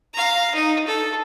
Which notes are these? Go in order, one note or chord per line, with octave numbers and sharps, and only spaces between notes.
F5 A#5
D#4
A4